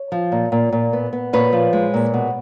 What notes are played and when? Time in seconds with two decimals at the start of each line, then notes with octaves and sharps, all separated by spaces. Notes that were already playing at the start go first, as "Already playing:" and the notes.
Already playing: C#5
0.12 F3
0.32 A#2
0.52 A#2
0.72 A#2
0.93 B3
1.13 B3
1.33 A#2 B4 C#5
1.53 F3
1.73 G#3
1.94 A#2
2.14 B2